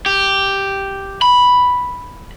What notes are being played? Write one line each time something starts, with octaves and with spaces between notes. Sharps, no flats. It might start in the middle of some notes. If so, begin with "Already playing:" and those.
G4
B5